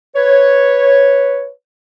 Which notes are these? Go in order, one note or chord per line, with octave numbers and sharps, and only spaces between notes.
B4 C#5